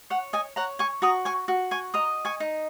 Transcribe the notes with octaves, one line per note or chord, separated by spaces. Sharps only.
C#5 F#5
D#5 G#5
C#5 F#5 A#5
G#5 C#6
F#4 A#5 D#6
G#5 C#6
F#4
G#5 C#6
D#5 A#5 D#6
G#5 C#6
D#4